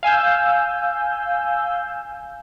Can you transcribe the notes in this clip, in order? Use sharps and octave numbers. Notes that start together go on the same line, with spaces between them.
F5 G#5 E6 G6